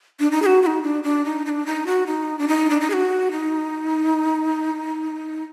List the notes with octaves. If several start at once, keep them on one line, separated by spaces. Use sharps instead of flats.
D4
D#4
G#4
F#4
F#4
D#4
D4
D4
D#4
D#4
D4
D#4
F#4
D#4
D4
D#4
D4
D#4
G#4
F#4
D#4